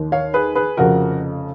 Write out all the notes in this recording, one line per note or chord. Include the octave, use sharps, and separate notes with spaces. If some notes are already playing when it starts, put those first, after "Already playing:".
Already playing: D#2 D#3
C#5 F5
G#4 B4
G#4 B4
F1 F2 C#3 F3 F#4 A#4